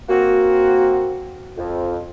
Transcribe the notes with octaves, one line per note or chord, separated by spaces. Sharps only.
A#3 C4 F#4
F2